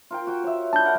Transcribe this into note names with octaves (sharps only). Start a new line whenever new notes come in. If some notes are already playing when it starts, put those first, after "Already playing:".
F4 A#4 G5
F#4 G5
C#5 E5
D4 E4 E5 A5 G6
A#4 F#5